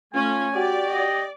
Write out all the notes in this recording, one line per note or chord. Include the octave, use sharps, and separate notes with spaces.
A3 C#4 F4 G#5
F#4 G4 D5
D#5